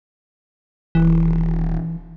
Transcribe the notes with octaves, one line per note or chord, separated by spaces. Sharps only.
D#1 E3